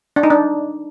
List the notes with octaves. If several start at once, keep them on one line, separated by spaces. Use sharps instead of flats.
D4
D#4
D4